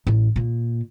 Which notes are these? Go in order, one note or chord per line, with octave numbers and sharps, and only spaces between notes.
A1
A#2